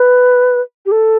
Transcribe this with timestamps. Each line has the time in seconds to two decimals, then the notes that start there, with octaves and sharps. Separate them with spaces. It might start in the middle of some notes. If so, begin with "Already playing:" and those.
Already playing: B4
0.86 G4
0.92 A4